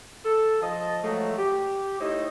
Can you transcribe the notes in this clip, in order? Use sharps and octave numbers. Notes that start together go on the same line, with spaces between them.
A4
F3 D#5 A5
F3 F#3 G#3 A3
G4
A3 D#4 E4 C5 C#5 D#5